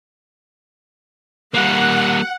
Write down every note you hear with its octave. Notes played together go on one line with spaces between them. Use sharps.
G3 A#3 F#5